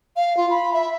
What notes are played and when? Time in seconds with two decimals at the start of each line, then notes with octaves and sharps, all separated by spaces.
0.16 F5
0.37 F4
0.50 B5
0.74 E5